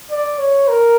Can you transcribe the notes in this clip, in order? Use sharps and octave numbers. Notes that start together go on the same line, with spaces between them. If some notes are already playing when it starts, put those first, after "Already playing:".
D5
C#5
A#4